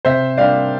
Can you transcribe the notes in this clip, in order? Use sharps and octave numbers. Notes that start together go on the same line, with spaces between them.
C3 C5 E5
G3 A#3 D4 D5 F5